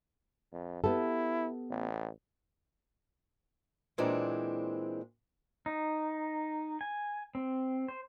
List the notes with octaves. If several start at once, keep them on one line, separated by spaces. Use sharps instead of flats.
F2
B3 E4 G4 A4
A1
A#2 E3 G#3 C4 D4
D#4
G#5
C4
C5